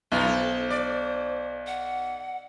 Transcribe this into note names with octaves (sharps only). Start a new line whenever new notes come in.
B1 F#3 B3 D#4 F4
A4 C5
D5
F#5